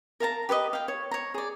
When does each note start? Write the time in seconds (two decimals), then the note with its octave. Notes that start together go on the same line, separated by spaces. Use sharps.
0.20 A#4 F5 A5 A#5
0.49 G4 B4 C#5 D#5
0.73 F5 G5
0.88 C#5
1.11 C#5 A#5
1.34 G#4 D5